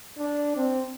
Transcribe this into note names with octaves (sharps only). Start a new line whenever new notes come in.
D4
C4